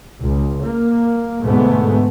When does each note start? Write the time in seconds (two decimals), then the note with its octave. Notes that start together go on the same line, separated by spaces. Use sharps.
0.21 C#2
0.63 A#3
1.42 D2 G#2 B2 G#3 A3 B3